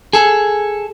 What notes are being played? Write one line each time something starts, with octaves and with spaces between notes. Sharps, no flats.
G#4 A4